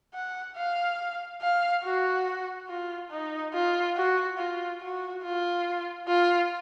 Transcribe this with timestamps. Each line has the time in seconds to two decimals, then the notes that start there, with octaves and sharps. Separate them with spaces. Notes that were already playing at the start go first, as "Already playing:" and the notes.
0.14 F#5
0.56 F5
1.42 F5
1.84 F#4
2.69 F4
3.10 D#4
3.53 F4
3.96 F#4
4.38 F4
4.81 F#4
5.24 F4
6.08 F4